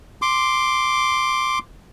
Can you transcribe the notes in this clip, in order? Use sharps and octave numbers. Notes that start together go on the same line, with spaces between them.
C6 D6